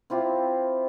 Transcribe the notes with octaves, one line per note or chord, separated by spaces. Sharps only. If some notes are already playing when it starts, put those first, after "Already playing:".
C4 E4 F4 G4